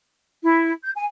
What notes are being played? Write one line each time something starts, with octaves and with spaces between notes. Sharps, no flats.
E4
G6
G#5